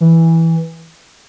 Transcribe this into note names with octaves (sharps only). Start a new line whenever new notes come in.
E3